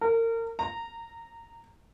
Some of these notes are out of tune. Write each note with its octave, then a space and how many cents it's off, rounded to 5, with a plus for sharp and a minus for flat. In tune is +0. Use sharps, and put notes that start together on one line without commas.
A#4 -30
A#5 -20